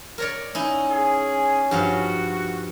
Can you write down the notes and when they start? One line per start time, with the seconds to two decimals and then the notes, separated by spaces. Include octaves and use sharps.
0.18 A#4 C#5 D5
0.55 C#4 D#4 E4
0.91 G#4
1.71 G2 F3 F#4 F5